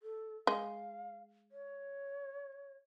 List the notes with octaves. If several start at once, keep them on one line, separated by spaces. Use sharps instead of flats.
A4
G#3 F5
C#5